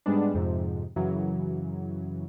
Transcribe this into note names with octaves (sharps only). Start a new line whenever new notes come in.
G#2 G3 G#3 B3 D4
F2 G#2 C3
F#2 C#3 E3 F#3